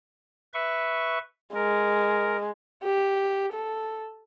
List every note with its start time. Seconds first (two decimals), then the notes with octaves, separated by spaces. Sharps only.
0.54 B4 E5 C#6
1.55 G#3 A#4
2.83 G4
3.53 A4